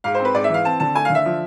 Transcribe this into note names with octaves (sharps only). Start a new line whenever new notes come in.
G#2 F5
C4 C5
B4
G#2 D5
E5
E3 F5
C4 A5
D3 A5
A3 G#5
D3 F5
E5
F3